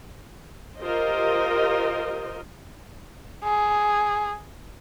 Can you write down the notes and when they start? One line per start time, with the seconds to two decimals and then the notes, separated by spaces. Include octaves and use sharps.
0.81 F4 G4 A#4 C5 D#5
3.44 G#4